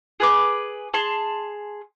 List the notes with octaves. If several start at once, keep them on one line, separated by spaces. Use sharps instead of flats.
G#4 B4 D6
G#4 A5 C6